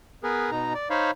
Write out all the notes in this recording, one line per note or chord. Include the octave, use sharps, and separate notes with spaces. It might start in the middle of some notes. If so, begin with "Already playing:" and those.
B3 G#4 A#4 B4
B2 D#4 A#5
D5
D#4 C5 C#5 F5 B5